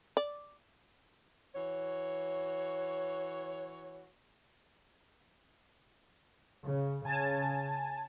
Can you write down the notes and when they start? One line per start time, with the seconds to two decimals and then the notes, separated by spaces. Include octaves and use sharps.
0.17 D5
1.54 E3 F#4 C#5
6.67 C#3
7.05 C#3 G#5 A5